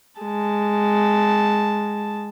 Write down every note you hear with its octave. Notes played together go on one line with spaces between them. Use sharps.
G#3 A5